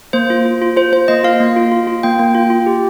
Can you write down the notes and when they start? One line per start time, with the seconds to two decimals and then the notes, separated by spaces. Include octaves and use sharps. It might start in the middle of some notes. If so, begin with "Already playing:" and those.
0.13 A#3 C5
0.30 F4
0.46 F4
0.62 F4
0.77 F4 C5
0.92 F4 C5
1.08 A#3 D#5
1.24 F4 F5
1.40 A#3
1.56 F4
1.72 F4
1.87 F4
2.03 A#3 G5
2.19 A#3
2.35 F4
2.50 F4
2.66 G4